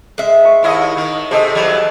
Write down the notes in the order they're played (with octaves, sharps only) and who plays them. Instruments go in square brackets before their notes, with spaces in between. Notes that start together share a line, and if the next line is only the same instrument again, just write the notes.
[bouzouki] G#3 E5
[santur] C#6
[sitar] D#2 E4 D#5
D#3
[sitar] C3 C4 [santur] G#4 A4 D#5
[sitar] E2 F#3 G3